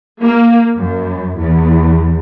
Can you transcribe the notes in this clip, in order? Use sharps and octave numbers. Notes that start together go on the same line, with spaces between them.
A#3
F#2
E2